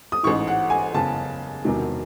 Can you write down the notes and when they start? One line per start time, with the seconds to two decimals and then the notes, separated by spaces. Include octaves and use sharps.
0.12 D#6
0.23 A1 G#2 E3 C#6
0.47 F#5
0.70 G#5
0.94 F#1 E2 C#3 A5
1.64 E1 E2 C3 D#3 F#3